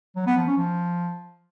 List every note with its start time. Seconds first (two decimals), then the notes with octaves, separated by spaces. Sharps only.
0.16 F#3
0.26 B3
0.37 F3
0.47 C#4
0.58 F3